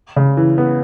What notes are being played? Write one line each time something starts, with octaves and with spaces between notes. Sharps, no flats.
C#3
E3
B3